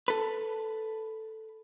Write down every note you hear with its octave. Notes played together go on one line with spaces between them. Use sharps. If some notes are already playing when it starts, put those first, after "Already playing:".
A4 B4